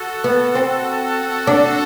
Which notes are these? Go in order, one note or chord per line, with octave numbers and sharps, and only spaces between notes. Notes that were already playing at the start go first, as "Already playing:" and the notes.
Already playing: F#4 A4
B3
C4
D4